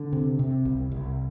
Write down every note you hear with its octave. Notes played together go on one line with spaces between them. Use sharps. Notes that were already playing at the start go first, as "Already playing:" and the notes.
Already playing: D3
C3
C3
C2
C2